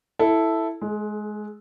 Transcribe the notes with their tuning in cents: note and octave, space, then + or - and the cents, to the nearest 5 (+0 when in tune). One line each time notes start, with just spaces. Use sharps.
E4 +0 A4 +0
G#3 +20 A4 -45